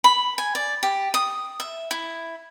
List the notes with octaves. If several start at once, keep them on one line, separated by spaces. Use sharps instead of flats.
B5
G#5
D5
G4
D#6
E5
E4